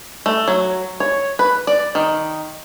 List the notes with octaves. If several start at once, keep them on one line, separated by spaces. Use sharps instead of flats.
A3
F#3
C#5
B4
D5
D#3